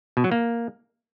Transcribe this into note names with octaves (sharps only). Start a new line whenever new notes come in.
B2
F#3
A#3